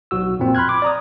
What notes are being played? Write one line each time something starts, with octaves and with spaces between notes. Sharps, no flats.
B1 F#4 E6
F2 A#2 C4
B5 C6 F6 F#6 G#6
D6
D5 A#5 D#6